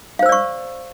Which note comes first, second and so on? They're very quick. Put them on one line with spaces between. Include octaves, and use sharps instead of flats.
F5 C5 E6 D5 C#6